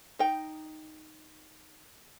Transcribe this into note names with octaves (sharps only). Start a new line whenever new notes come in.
D#4 G5